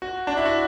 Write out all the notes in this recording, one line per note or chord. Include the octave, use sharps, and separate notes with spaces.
F#4
D4
E4
F#4